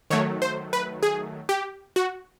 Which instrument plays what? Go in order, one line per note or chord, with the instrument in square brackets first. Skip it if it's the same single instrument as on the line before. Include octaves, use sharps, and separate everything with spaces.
[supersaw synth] D#3 F#3 A3 C#5
C5
B4
G#4
G4
F#4